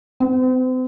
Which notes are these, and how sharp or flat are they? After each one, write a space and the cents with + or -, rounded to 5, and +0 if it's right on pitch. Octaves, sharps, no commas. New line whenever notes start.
C4 -40